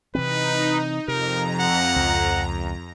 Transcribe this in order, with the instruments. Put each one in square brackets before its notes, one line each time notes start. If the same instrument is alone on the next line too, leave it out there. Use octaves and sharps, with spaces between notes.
[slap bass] C3 E3 C4 [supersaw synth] D#4 [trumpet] B4
[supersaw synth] F2 A#5 [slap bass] C3 [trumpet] A#4
[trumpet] F#5
[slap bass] C#2